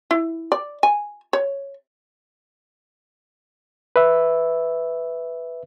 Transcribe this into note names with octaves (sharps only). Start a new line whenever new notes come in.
E4
D5
G#5
C#5
B4 E5